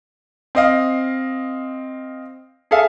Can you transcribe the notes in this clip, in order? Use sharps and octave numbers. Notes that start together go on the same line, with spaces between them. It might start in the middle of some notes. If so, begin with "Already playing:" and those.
C4 D#5 F5
G#4 A4 E5 F5 G#5